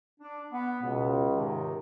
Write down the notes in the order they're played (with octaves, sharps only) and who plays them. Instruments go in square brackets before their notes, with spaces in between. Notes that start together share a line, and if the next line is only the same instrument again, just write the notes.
[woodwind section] D4
B3
[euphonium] C#2 [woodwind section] B2
[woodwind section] G#2 C3 D#3